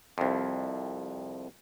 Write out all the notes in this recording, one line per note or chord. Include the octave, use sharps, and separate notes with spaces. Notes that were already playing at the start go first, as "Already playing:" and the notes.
C2 F2